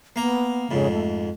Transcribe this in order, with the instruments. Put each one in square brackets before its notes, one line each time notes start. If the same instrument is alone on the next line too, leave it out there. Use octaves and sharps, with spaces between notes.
[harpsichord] A#3 A#5 [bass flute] B3
[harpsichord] F2 G#2 [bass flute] C#3
[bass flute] A3